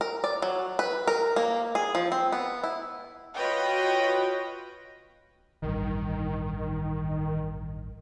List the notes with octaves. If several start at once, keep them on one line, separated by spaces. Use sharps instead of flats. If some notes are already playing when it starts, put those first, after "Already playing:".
A#4
D5
F#3
B4
A#4
A#3
G#4
F3
C4
B3
E4
F4 F#4 B4 C#5 D#5 G5
E1 A1 G2 D#3